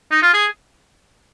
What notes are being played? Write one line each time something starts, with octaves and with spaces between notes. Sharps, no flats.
D#4
F4
G#4